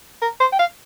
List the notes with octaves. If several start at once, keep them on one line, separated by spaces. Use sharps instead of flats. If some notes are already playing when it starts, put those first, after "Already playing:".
A#4
C5
G5
F5